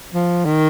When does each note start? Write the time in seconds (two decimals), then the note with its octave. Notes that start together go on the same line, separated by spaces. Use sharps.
0.14 F3
0.45 D#3